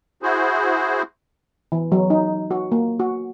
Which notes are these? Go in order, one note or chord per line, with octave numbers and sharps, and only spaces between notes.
E4 F#4 G#4 C5
E3
F#3
D#4
F#4
A#3
F#4